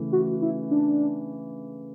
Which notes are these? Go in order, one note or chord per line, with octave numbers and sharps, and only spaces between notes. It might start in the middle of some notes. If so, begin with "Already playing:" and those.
Already playing: C#3 E3 A3
F#4
E4
D4